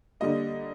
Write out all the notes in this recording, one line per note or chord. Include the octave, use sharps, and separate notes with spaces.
D3 G3 A#3 D#5